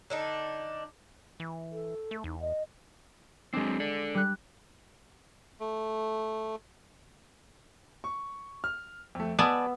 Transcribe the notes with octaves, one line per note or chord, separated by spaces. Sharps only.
D3 D4 D#4
E3
A4
A3
E2 D#4
D#5
F#3 G#3 C4 D4
A4 D5
G3 F#6
A3
C#6
F6
F2 A3
B3 D5 G#5 A5 B5 E6